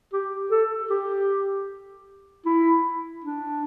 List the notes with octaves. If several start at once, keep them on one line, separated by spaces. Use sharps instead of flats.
G4
A4
G4
E4
D4